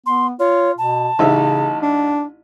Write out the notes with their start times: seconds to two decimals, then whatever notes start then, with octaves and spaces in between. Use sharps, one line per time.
0.06 B3 C6
0.40 F4 C#5
0.78 B2 A5
1.19 A1 C#3 D#4 E5
1.82 D4